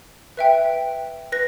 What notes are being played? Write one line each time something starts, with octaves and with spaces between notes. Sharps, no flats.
B4 E5 G5
B4 A#6